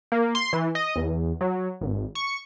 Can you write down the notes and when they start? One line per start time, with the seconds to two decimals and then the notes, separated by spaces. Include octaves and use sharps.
0.12 A#3
0.35 C6
0.53 E3
0.75 D#5
0.96 E2
1.41 F#3
1.81 G#1
2.15 C#6